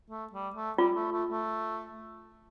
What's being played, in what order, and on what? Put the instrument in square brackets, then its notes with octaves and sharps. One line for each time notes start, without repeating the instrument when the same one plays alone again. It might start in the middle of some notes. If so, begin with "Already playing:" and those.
[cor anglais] A3
G3
A3
[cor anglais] G3 [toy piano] F4
[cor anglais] A3
A3
A3